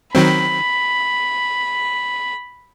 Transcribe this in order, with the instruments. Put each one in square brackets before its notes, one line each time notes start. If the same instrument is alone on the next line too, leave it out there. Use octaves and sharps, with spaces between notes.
[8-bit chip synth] D#3 F#3 C4 [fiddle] B5